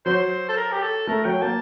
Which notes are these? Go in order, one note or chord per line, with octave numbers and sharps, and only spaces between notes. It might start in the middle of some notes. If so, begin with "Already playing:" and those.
F#3 C5
A4
A#4
G4
A4
A3 A#4
F#3 G5
A#3 A5